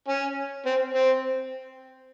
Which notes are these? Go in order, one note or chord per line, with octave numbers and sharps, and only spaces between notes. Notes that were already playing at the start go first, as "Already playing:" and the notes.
C#4
C4
C4